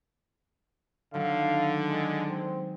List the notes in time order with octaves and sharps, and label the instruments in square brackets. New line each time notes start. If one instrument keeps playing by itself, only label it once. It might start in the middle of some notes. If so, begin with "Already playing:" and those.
[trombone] D3 [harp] D#3 F#3 [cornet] F5
[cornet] G#3
[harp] G#3 [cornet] C4